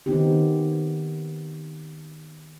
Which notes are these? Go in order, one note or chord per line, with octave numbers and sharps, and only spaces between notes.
D#3 B3 C4 D#4 G4